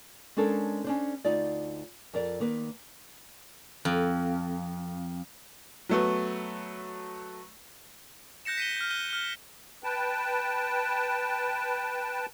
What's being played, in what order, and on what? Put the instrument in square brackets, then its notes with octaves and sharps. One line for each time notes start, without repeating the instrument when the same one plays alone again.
[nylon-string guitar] G#3 C#4 D4 A4 A#4 C5
C#4 D4 C5
D2 D#4 F4 D5
F2 A#4 D5
D#3 A#3 B4
[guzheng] F2
[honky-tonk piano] F#3 A3 B3
[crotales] F#6 G6 A#6 C#7 E7
B6 D#7 G7
F6 G6
F#6 D#7 G7
F6 G7
[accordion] B4 G5 A5